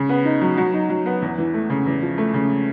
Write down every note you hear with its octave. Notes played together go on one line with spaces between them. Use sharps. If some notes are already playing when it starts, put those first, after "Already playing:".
Already playing: C#3
B3
D#4
F#3
F#3
D#4
F#3
B3
E2
E3
A3
C#3
E2
F3
A3
C#3